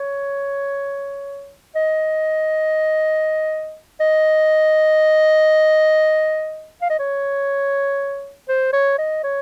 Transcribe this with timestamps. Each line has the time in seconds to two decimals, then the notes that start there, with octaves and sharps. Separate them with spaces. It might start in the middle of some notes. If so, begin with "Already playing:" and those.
Already playing: C#5
1.76 D#5
4.00 D#5
6.82 F5
6.90 D#5
6.99 C#5
8.49 C5
8.73 C#5
8.98 D#5
9.24 C#5